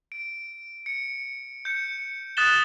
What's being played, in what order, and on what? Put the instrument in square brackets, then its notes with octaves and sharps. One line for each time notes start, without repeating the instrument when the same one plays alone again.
[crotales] D7
C#7
G6 C#7
D#6 F#6 A6 B6 E7 G7